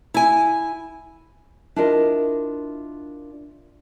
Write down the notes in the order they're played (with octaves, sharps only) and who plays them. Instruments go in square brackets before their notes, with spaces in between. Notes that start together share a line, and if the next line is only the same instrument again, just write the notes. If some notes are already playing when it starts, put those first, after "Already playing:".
[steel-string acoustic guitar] E4 G#5
[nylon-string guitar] D4 E4 F4 A#4 D#5